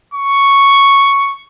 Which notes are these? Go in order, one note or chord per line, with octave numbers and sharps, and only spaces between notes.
C#6